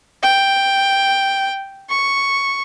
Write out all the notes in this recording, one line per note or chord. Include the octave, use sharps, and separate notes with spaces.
G5
C#6